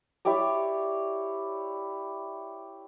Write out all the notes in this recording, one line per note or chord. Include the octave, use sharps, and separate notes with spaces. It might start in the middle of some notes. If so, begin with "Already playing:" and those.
E4 G4 C#5 D5